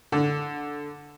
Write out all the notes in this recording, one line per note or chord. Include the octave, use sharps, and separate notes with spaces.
D3